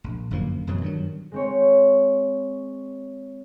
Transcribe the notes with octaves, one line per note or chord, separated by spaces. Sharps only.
A#1
G1 F#2 F3 A#3
F#2 B2 E3 F#3
G2 D#3 F3 F#3
G#3 C4 C#5